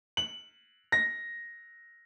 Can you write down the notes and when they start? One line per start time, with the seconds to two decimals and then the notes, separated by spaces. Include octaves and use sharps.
0.17 F#7
0.92 A#6